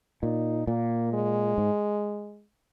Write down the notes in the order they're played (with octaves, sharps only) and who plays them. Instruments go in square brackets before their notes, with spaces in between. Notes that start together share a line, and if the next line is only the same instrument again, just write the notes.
[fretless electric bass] A#2 [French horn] D#4
[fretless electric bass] A#2 [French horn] A#3
[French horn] G#3
[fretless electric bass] G#2